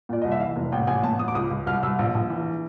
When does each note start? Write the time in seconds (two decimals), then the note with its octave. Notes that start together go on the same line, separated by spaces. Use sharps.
0.09 A#2 D5
0.22 C2 D#5
0.31 E5
0.40 E3 F5
0.56 F1
0.72 A1 G5
0.87 A1 G#5
1.03 A1 A5
1.19 A1 D#6
1.28 D6
1.35 C#2 D#6
1.51 C#2
1.66 C2 F6
1.83 C2 E6
1.99 A#1
2.15 A#1
2.30 E3